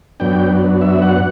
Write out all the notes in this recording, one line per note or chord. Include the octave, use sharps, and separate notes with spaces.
F#2 F#3 B3 D4 G5
E5
F#5